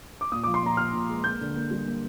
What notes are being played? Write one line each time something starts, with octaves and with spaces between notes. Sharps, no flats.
D6
A#2 D#6
F3 D6
C6
A#2 A#5
A#2 F6
A#2
G#3
A#3 G6
D3
A#3
G3
A#3